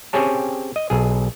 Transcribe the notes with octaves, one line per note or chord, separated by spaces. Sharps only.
C4 C#4 G4 G#4 C#5 A5
D#5
B1 G#4